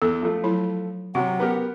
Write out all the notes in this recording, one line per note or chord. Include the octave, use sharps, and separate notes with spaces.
E2 A4
F3 A3
F#3 E4
C3 F#3 F#4 F#5
B3 G4 A#4